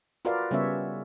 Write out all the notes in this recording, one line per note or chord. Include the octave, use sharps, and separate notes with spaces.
F4 F#4 A#4 B4 D5 F5
C#3 G3 B3 C#4 C#5 E5